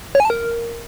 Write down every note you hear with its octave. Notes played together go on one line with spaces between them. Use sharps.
C#5
G#5
A5
A#4